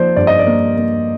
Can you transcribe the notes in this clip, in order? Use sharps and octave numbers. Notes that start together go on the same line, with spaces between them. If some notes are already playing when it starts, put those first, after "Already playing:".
Already playing: F3 A#3 C5 D5
G2 D5
D#5
D5
A#3
A#3